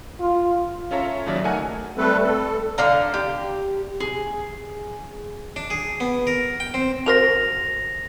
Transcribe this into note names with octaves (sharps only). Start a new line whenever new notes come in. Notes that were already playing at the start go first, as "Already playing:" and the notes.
F4
C#4 F4 A4 C#5 E5 A#5
D#2 C#3 F#3 D5 E5
A3 A#3 D#4 A#4 F#5 G#5
G3 A3 C4 A4 B4
A4
D3 D4 F5 A#5
G4
G#4
D4
G#4
B3
A#4
G5
C4
F#4 A#4 C5 A#6 F7